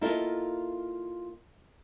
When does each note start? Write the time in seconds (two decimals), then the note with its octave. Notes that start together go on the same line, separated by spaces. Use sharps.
0.01 A#3 E4 F4 A4 A#4 D#5